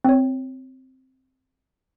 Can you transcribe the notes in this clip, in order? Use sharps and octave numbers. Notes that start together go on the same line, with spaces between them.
C4 C#5